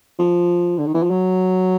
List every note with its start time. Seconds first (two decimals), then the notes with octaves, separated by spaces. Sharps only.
0.19 F3
0.78 D3
0.86 D#3
0.94 E3
1.03 F3
1.10 F#3